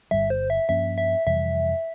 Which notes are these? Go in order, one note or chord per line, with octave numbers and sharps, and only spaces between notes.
G1 G2 G3 E5
C5
E5
G2 F3 A#3 C#4 E5
E5
F2 C3 E3 G3 E5